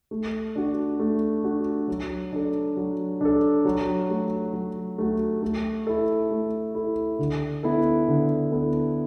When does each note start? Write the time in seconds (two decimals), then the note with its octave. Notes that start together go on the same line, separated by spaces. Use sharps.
0.11 A3
0.55 D4 F#4
1.00 A3
1.44 D4 F#4
1.88 F#3
2.32 D4 A4
2.77 F#3
3.21 D4 A4
3.65 F#3
4.09 A3 F#4
4.54 F#3
4.98 A3 F#4
5.43 A3
5.87 E4 A4
6.31 A3
6.75 E4 A4
7.19 D3
7.63 B3 E4 A4
8.08 D3
8.52 B3 E4 A4